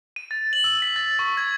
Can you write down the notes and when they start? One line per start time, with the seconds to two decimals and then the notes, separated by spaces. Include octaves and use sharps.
0.16 D#7
0.31 A6
0.53 F#7
0.64 E6
0.82 B6
0.96 A6
1.19 C#6
1.37 G#6